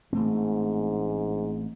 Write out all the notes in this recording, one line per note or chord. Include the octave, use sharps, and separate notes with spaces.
A1 G#2 A3 C4